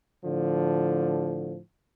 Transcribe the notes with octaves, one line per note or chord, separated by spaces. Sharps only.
A2 D3 F3